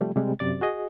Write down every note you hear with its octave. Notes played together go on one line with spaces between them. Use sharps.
C3 F3 G3 A3
C3 G3 G#3
F#2 C3 D5 A6
F#4 G#4 D#5